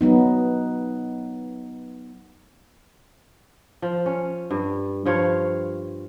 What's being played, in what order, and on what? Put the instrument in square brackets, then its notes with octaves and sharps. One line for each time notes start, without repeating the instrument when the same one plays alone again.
[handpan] F#3 B3 D#4
[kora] F3
C#4
G2
G2 F3 C#5 F5